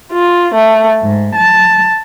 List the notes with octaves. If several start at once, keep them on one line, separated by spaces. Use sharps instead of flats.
F4
A3
G#2
A5